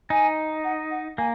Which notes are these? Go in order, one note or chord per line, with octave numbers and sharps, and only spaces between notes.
D#4 G#5
F#5
F#5
A#3 G#5